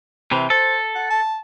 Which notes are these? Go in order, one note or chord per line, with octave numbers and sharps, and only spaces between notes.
C3 E3 C5
A4 C5
F#5
A5